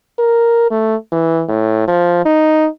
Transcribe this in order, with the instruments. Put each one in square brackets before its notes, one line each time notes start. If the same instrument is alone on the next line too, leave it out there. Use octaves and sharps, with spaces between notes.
[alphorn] A#4
A3
E3
A2
F3
D#4